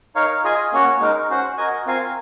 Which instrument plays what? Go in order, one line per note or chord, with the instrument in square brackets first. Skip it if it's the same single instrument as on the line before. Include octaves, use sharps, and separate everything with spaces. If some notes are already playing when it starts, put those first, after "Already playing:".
[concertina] D#4 A#4 C#5 F5
F4 G#4 D#5 G#5
A#3 C#4 F#4 C#5
G#3 D#4 A#4
C#4 F#4 C5 F#5
F#4 A#4 D#5 G#5
C4 F4 A#4 F5 G#5